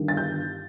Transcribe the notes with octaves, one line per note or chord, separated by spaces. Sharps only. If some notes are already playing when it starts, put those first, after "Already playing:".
Already playing: G1 G2 D#3
A6
G6